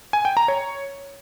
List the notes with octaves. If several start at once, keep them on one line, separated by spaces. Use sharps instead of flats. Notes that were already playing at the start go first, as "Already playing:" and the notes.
G#5
G5
A#5
C#5